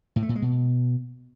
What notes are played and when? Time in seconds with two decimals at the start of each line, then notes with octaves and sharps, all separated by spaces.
0.16 A2
0.23 A3
0.29 A#2
0.36 G#3
0.42 B2